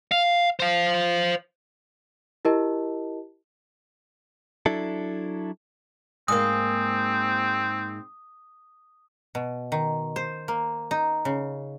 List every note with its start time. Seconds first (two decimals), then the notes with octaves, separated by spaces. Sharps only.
0.11 F5
0.60 C5 F5
2.45 E4 G4 A#4 D#5 A5
4.66 F#3 D4 E4 A4
6.28 G#2 A#3 C4 D#6
9.35 B2
9.72 D#3
10.16 C5
10.48 A#3
10.91 D#4
11.25 C#3